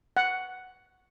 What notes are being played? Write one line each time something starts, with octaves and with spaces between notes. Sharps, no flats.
F#5